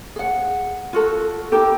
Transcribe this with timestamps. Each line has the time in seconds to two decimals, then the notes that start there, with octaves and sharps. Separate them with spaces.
0.16 G#4 F#5
0.93 F4 F#4 A4
1.52 D#4 E4 G4 A4